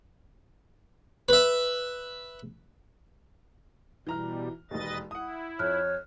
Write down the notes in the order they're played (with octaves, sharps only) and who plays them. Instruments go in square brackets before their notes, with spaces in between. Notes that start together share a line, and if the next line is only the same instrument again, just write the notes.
[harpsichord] B4 E5
[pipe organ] B2 G3 [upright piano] E3 A#5 F6
[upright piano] E1 D#2 [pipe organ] B4 D#5 A6
[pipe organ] E4 [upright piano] F#5 D#6
[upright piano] F2 [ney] C#5 [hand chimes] F6 F#6